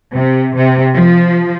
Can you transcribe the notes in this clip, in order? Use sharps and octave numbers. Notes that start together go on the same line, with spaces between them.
C3
C3
F3